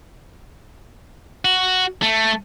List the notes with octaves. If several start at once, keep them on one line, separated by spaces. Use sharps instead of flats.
F#4
A3